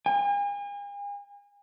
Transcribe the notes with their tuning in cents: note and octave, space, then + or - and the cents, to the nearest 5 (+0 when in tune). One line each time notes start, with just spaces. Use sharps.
G#5 -40